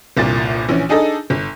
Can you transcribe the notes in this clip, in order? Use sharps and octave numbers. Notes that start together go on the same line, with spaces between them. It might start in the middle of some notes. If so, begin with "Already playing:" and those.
G1 C2 A#2 A6
A#1 E3 C#4
D4 D#4 G#4 A4 D#5
G1